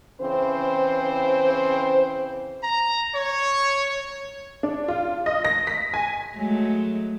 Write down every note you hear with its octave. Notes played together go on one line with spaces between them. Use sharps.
C#3 E3 C4 C5
A#5
C#5
D4
F4
D#5
A#6
B6
G#5
F#3 G#3 A3